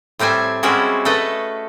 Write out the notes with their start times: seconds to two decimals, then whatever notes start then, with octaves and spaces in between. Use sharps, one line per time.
0.19 A2 G3 C4 E5 G#5
0.63 G3 G#3 C4 C#4 E4 F#4
1.05 A3 A4 B4 D#5